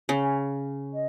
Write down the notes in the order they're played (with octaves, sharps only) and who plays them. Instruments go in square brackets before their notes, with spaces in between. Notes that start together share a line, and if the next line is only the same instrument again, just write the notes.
[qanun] C#3
[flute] G#5
D#5